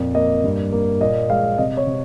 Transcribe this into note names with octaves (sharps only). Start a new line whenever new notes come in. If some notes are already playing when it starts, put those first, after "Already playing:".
Already playing: F2 A#2
A#3 D#5
G2
A#3
A#2 D#5
G#3 F5
C3 D#5
C#5
C3